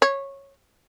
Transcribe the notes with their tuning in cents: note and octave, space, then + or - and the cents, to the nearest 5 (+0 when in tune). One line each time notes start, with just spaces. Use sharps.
C#5 -10